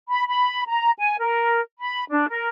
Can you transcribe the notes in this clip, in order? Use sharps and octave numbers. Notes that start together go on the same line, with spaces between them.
B5
B5
A#5
G#5
A#4
B5
D4
A#4